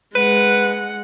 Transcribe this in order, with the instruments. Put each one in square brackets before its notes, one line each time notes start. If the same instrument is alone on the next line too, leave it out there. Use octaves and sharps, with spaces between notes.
[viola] G#3 F#5 [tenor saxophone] B4